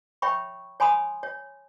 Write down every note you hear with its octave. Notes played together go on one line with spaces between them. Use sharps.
C#5 E5 G5 B5 C#6
C#5 G#5 B5 C6 D#6
C#5